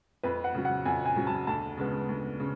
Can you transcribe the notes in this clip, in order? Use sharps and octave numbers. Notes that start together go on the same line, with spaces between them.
F2 B4
F#5
C#3 F#3
F#5
F2 G#5
G#5
C#3 F#3
A5
D2 A5
C#3 G#3 B3
D2
C#3